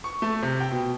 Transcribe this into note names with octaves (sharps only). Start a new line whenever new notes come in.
C#6
A3
C3
G5
B2